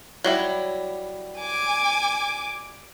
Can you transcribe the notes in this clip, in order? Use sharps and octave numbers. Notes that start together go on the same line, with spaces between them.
F#3 G3 E4
G#5 D6